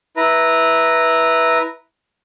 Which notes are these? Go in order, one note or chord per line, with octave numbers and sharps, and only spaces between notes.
E4 B4 A#5